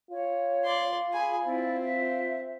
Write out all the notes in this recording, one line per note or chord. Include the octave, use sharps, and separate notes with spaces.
F4 C#5
D5 C6
G#4 G#5 B5
C4 E4 D5
E5